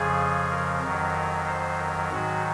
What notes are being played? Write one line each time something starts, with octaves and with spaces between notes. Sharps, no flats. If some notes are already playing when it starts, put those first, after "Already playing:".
Already playing: F2 C#3 F3 G#4
A#4
F2 D#3 F#3
C5
A#4
G#2 D#3 F#3 F#4